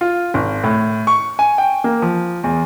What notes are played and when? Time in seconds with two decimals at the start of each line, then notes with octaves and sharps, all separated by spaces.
0.01 F4
0.34 G#1
0.64 A2
1.07 C#6
1.39 G#5
1.58 G5
1.84 A#3
2.02 F3
2.44 E2